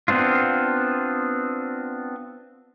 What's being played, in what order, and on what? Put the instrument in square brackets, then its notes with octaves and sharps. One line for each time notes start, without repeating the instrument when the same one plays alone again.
[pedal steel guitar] B3 C4 D4 F4